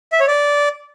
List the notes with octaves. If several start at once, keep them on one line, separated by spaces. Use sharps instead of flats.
E5
C#5
D5